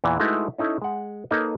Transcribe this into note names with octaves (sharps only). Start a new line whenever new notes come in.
E2 A#2 E3
G#3 A3 D#4 E4 F#4 B4
C#4 D#4 E4 A4
G#3 F#5
A#3 D#4 A4 B4 C#5 D#5